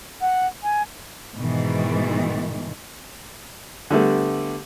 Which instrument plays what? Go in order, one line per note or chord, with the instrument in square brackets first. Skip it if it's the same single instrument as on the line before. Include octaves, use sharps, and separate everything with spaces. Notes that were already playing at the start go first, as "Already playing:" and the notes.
[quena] F#5
G#5
[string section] G#2 B2 D#3 E3
[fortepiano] D3 G3 A3 B3